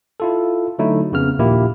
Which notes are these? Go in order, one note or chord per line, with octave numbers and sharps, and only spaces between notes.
E4 F4 A4
D3 F#3 A3 D#4 E4
F2 C#3 B3 F6
A#1 D#2 A#2 A#3 E4 G4